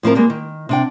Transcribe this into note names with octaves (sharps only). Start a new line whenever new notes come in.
A2 F3 C4 A#4
G3 G#3 A#3
D#3
C3 D4 G5